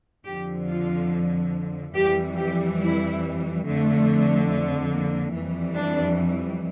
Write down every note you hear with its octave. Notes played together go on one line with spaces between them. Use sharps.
F2 D3 F3 G4
F4
F2 E3 G3 G4
G4
E4
F2 D3 A3
A3
A#3
F2 E3 G3
D4